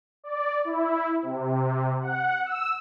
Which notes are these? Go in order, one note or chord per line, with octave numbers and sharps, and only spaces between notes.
D5
E4
C3
F#5
E6